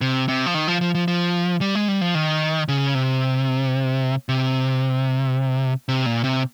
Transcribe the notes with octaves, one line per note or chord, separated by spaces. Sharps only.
C3
C3
F3
D#3
F3
F3
F3
F3
G3
G#3
G3
F3
D#3
C#3
C3
C3
C3
A#2
C3